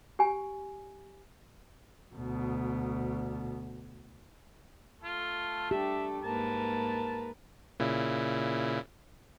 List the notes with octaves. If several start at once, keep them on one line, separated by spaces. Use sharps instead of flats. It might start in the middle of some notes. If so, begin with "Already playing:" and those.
G4 G#5
D2 B2
A3 F4 A4
D4 G4 E5
G#2 A#3 A#4 B4 A5
A#2 C#3 E4